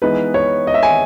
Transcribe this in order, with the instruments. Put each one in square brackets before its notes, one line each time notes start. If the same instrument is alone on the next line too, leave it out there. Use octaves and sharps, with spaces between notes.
[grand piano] E3 G#3 B3 D#4 B4
C#5
D#5
E5
G#5